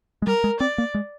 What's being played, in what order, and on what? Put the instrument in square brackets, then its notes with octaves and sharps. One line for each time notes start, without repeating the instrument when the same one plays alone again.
[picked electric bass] G#3
[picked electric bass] G3 [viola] A#4
[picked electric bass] G#3
[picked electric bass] C4 [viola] D5
[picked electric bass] A#3
G#3